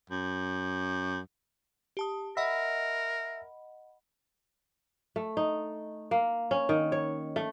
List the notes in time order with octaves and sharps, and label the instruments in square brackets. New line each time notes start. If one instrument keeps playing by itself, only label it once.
[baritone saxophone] F#2
[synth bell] G4 A5 D#6
[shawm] A#4 [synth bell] D#5 F#5 B5 [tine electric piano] E5
[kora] A3
D#4
A#3
C#4
D#3
C#5
A3